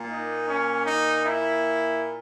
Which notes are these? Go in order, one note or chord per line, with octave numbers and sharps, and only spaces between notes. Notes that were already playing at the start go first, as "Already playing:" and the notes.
Already playing: A#2 A#3
D#4
C#4
D#4
E4